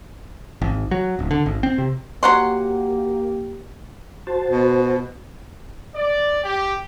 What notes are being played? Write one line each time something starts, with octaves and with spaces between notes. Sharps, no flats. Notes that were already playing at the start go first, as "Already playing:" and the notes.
G#1
F#3
D1
D3
G#1
C4
C3
F#3 A#3 G4 F#5 C6
F#4 C5 A5
B2
D5
G4